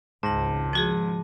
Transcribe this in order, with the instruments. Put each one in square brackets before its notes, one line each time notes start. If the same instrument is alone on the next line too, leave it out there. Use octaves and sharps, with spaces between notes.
[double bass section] G#1 C#2 [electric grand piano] G#2 [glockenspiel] A5 A#6 F#7
[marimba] F3 F#4 G#4 [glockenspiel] D#7